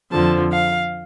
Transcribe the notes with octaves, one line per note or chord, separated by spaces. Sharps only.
F2 D3 F3 A5
F5